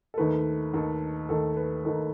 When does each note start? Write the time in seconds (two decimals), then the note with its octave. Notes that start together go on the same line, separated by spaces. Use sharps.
0.14 A4
0.18 D#2 D#3 A3 B4
0.74 D#2 D#3 A3 A4
1.29 D#2 D#3 A3 A4
1.57 B4
1.85 D#2 D#3 A3 A4